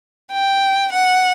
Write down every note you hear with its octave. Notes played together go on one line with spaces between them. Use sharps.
G5
F#5